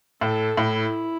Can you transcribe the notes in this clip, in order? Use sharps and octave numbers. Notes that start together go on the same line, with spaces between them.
A2 A4
A2 E4